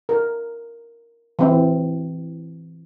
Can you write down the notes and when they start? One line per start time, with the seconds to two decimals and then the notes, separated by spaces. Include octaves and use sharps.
0.09 A#4
1.39 E3 C4